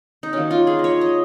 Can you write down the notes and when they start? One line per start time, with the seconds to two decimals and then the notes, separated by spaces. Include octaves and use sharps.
0.23 D#4
0.33 D#3 F#3 A#3 C#4
0.51 F4
0.67 G#4
0.79 D#5
0.84 C#5
1.01 D#5